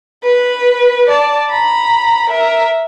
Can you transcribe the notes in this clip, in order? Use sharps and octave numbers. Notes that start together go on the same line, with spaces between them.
B4
D5 A5
A#5 B5
A#4 E5